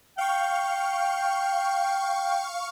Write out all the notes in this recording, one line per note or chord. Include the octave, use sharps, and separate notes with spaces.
F5 G5 C#6